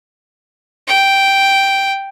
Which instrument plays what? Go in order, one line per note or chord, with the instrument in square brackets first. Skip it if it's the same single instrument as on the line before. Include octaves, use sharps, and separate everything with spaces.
[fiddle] G5